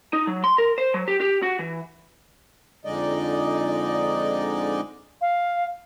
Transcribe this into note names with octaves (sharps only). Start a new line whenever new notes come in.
D#4
F#3
C6
A#4
C5
F#3
G4
G4
F#4
E3
F2 D3 G#3 D#4 D5 D#5
F5